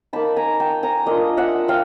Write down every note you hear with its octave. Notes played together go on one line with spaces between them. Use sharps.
A#3 D#4 A5 B5
G#5 A#5
G5 A5
G#5 A#5
A#3 D4 F4 D#5 F5
E5 F#5
F5 G5